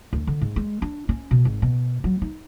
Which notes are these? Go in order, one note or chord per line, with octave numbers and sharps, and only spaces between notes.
D2
D3
G#2
G#3
D4
C#4
B2
G#1
B2
F#3
D#4